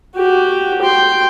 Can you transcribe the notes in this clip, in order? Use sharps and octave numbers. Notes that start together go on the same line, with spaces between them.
F#4 G4
G5 C6